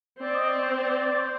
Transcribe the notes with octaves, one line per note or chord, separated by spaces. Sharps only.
C4 D5
D#5
D5
C5
D5
D5
D5
C5